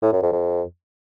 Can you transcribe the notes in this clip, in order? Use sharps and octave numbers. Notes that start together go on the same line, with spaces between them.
A2
F#2
F2
F2